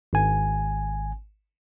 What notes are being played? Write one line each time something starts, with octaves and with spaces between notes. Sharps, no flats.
G#1 G#5